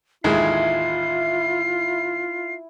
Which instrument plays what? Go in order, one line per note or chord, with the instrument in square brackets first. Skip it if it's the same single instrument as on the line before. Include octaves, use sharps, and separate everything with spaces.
[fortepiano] A1 D#2 G#3 [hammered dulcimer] E4 [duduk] F4 [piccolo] C7